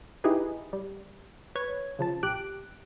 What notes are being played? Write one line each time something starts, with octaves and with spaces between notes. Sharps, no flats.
D#4 E4 G4 G#4 B4
G3
B4 C#5 G#6
C#3 F3 A5
A#1 G4 F#6 D7